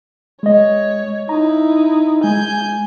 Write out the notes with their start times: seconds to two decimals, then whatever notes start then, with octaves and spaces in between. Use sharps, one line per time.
0.43 G#3 C#5 D#5
1.29 D#4 E4 A#5
2.24 G#3 G#5 G6